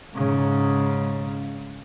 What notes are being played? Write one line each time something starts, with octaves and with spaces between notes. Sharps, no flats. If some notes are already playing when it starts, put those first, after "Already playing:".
G#2 C#3